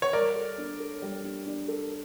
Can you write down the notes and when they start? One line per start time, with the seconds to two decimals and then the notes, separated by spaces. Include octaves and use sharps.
0.02 C#5
0.13 G3 A#4 D5
0.36 A4
0.58 D4
0.80 A4
1.02 G3
1.24 D4
1.46 D4
1.68 A4